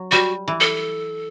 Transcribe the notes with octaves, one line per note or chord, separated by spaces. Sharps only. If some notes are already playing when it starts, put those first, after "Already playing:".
Already playing: F#3
G3 F#4
E3
A4